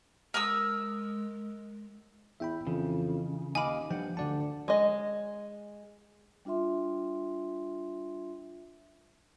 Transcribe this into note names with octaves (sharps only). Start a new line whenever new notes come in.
G#3 A#4 D#6 E6
E2 E5 G5 B5
F2 C#3 E3
D#2 D#5 F5 G#5 B5 D6
G2 F3 F#5 G5
D2 D3 D5 F#5 A5
G#3 D#5
G3 D4 F4 E5 C6